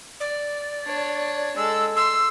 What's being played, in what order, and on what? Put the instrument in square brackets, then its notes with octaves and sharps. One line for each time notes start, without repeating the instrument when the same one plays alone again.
[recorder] D5
[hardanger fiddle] D4 C#5
[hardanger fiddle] G#3 A4 [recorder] E6
[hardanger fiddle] C6 [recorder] E6